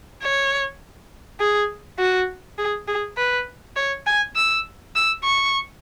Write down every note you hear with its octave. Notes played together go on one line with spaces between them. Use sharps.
C#5
G#4
F#4
G#4
G#4
B4
C#5
G#5
E6
E6
C#6